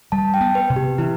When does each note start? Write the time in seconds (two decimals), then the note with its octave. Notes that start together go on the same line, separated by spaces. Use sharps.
0.12 G3 A5
0.34 G5
0.41 B3
0.55 B4
0.70 C3
0.76 G4
0.98 E3 E4